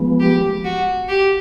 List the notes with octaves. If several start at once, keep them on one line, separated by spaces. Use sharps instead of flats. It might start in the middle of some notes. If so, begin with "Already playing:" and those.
Already playing: F3 G#3 B3
G4
F#4
G4